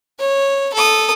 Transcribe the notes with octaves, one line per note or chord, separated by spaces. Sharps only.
C#5
A4 D#6